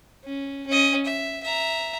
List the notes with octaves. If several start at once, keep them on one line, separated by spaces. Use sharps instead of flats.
C#4
C#4 D#5
E5
E5 A#5